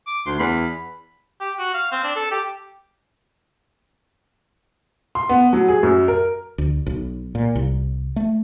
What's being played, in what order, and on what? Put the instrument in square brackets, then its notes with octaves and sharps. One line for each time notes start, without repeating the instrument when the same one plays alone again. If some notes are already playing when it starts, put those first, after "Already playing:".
[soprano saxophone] D6
[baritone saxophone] D2 [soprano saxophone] C6
[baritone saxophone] E2 [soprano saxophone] B5
[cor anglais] G4
F#4
F5
C4
D4
A4
G4
[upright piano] C6
B3
F#3
G#4
F#2
A#4
[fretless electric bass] D2
B1
A#2
C2
A3